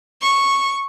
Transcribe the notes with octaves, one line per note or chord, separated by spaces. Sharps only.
C#6